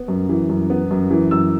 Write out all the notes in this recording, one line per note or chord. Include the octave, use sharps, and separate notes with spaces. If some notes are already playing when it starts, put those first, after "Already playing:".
Already playing: B3
F#2
E3
F#2
B3
F#2
E3
F#2 E6